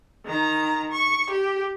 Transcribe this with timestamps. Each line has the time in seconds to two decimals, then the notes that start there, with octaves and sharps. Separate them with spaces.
0.25 D#3 A#5
0.92 C#6
1.30 G4